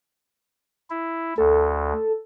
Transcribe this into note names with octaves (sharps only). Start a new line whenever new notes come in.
E4
D2 A4